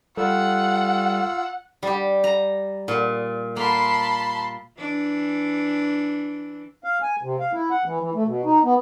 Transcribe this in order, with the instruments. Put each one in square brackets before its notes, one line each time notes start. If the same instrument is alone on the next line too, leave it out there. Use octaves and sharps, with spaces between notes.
[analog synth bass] G3 [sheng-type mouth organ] F4 E6 [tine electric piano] A4 [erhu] F#5
[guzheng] G3 G4
A#5
A#2
[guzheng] A#3 [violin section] A5 B5 C6
[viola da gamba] E3 D4
[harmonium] F5
G#5
C3
F5
E4
F#5
E3
E3
A3
B2
D#4
B3